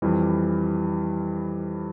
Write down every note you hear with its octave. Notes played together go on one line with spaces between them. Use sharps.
F2 E3 G3